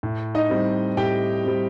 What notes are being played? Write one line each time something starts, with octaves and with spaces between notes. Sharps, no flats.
A2
D#4 D#5
G3 C4
A2 G4 G5
G3 C4